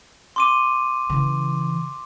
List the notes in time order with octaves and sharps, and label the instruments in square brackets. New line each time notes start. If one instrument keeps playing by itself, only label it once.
[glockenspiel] C6 D6 D#7
[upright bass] C#3 E3